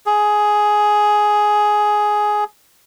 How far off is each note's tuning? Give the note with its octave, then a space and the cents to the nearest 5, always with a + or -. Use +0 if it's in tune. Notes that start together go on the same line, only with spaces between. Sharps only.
G#4 +10